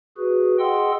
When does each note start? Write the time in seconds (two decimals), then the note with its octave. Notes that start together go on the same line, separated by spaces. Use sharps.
0.17 F#4 G#4 B4
0.59 G#4 D#5 F#5 G5 C6 E6